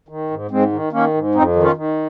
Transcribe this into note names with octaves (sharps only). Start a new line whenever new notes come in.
D#3
G#2
G#2 G#3 C4
D#3
D#3 A#3 C#4
G#2
F2 C4 D#4
D#3
C#4 F4
D#3